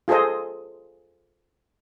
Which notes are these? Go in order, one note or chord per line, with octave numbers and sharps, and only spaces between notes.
F4 G#4 A4 C5 D#5